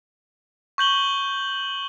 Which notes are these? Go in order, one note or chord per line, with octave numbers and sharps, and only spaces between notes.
C#6 G6 F#7 G7